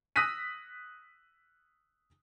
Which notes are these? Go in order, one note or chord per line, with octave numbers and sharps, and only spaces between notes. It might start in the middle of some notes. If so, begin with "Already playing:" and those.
D#6 E6 F#6 A#6 B6 D#7